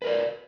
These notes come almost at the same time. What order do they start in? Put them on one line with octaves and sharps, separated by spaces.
B4 A#4 D5